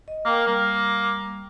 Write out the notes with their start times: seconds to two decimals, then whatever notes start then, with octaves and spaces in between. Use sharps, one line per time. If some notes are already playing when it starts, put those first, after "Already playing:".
0.08 D#5
0.25 A#3 A#4 G5
0.47 G3 A#3